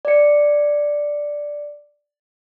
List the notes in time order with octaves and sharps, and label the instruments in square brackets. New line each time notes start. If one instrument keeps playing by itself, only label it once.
[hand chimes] D5 C#7